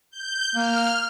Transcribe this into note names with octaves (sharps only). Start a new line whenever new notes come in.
G6
A#3 F6